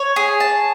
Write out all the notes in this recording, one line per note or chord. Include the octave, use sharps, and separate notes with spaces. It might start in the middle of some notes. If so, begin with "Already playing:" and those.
Already playing: C#5
G#4
A5